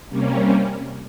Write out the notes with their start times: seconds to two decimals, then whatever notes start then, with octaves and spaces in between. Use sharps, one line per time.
0.09 C3 G3 A#3 C#4